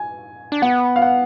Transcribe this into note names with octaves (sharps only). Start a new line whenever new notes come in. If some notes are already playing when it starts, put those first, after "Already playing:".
Already playing: G#5
D4
B3 F#5
F5
F#5